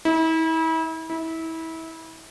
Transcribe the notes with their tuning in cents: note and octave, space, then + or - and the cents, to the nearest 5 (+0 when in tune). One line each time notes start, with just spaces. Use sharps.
E4 -35
E4 -25